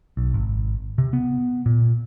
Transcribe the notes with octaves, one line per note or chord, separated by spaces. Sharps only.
B1
G#1
C3
B3
A#2